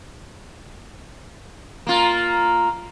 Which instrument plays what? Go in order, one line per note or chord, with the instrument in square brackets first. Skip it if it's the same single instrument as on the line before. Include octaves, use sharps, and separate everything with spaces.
[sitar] A#3 F4